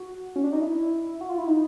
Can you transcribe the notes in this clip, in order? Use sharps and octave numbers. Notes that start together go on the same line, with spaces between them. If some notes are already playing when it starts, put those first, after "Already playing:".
Already playing: F#4
C#4
D4
D#4
E4
F#4
F4
E4
D#4